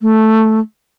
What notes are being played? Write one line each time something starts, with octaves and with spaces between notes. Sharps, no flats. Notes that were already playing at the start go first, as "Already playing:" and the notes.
A3